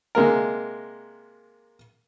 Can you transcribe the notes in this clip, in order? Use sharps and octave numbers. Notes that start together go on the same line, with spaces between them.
C3 G#3 A#3 A#4